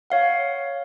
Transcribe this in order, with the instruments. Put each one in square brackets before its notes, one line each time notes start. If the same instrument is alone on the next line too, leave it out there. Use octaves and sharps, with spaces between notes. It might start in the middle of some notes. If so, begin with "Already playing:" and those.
[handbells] C#5 F5 F#5